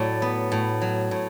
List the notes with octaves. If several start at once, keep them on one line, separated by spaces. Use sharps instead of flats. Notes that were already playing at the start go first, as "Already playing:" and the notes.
Already playing: A2 F#3 D5
B3
A2
F#3
A2